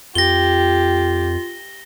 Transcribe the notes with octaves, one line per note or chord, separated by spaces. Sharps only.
F2 F4 G4 A#6 G7